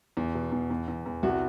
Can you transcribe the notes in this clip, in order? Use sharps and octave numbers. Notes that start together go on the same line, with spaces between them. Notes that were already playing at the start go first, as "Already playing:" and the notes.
E2
B2
E2
E2
E2
E2
C2 F#4